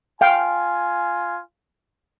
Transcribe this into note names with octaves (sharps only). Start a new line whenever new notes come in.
F4 F5 G5 G#5